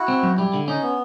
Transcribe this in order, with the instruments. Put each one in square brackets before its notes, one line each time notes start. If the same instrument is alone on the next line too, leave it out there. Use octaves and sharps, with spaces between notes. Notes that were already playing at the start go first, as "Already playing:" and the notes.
Already playing: [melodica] E4 F#4
[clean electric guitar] C4
F#2
[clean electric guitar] G3 [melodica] E4
[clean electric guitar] D3
[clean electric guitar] C#4 [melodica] D#4
[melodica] B3